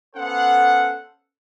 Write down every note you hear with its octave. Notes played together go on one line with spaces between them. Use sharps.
B3 C#4 A4 C5 F5 F#5